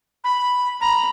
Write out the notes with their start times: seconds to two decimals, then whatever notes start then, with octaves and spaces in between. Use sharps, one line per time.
0.24 B5
0.81 A#5 B5